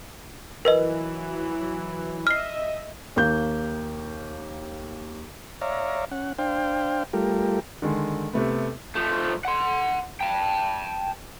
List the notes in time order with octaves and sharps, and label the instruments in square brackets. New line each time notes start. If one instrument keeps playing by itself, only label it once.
[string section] E3 F#3 [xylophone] A#4 B4 D#5
[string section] D#5 E5 [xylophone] F6 C7
[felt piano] D#2 A#3 G6
[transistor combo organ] C#5 D5 E5 F5 A#5
C#4 F#5
D4 C5 F5 G5
G3 A3 F4 G4 A#4
[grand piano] D3 D#3 G#3
C3 A3 B3
[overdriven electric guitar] F3 A3
F#5 C6
G5 A5